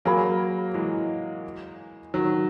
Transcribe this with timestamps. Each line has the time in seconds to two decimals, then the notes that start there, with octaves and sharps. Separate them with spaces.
0.05 F#3 A#3 G#4 C#5 G#5 B5
0.74 E3 G#3
2.14 D#3 F#3